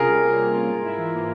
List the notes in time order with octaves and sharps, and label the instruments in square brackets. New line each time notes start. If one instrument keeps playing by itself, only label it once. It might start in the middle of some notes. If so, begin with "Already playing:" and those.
Already playing: [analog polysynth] C3 C#4 F4 [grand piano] G#4 A#4
[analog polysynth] G3
A#3
C3
F4
G#2
E4
E3
A#3